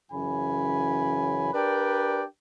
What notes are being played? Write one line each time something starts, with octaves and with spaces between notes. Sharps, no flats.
F#2 C#3 E3 G#5 B5
D4 G4 A#4 B4 D5 G5